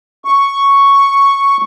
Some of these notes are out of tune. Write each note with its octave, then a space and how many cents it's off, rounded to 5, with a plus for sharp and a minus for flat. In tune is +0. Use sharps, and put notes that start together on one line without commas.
C#6 +0